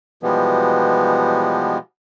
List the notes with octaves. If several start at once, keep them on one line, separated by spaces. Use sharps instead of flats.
B2 E3 F3 G3 G#3 B3